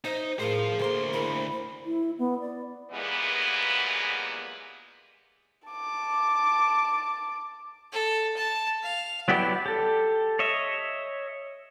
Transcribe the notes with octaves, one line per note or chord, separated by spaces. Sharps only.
D#4 C5 E5
A2 G#4 A#4 C5 F5
D2 A#3 A4 A#4 C5 C6
E4 A#4 B5
C5
E4
B3
D5
F#2 A#2 E3 G3 G#3 B3
A5 D6
A4
A5
F5
F#3 B3 E4 G4 D5
G4 A4
C#5 D#5 E5